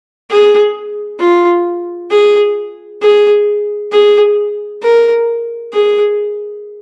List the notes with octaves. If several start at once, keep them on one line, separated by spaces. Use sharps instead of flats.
G#4
F4
G#4
G#4
G#4
A#4
G#4